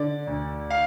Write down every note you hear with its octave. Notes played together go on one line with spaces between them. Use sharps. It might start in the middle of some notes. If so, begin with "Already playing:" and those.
Already playing: D3 D5
D2
F5